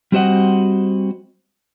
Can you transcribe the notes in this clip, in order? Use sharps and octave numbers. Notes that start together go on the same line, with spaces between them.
G3 C4 F#4 C5 D#5 F#5